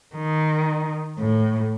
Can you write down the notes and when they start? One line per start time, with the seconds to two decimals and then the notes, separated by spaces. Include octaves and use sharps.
0.16 D#3
1.19 A2